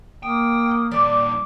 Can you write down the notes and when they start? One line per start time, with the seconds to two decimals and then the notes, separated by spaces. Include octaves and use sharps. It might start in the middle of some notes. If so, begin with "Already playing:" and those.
0.23 A#3 G5 D#6
0.91 A#2 G3 D5 D6